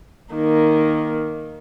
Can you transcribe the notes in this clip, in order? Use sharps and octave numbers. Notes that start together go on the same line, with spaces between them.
D#3 A#3